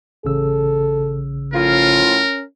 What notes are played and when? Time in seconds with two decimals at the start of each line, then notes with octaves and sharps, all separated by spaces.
0.25 A1 C#3 A4 E6
1.54 A2 F3 C#4 F4 A#4